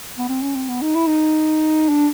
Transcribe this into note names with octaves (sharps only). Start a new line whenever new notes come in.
B3
C4
C#4
C4
B3
D#4
E4
D#4
D4